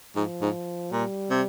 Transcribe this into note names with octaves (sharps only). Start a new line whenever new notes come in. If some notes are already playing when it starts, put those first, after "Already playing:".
G#2 F3
G#2
A#2 G3
C3